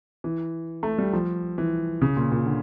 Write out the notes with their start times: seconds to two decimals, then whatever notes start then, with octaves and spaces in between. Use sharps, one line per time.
0.24 E3
0.83 A3
0.98 G3
1.13 F3
1.58 E3
2.02 C#3
2.16 A#2
2.31 A#2
2.46 D3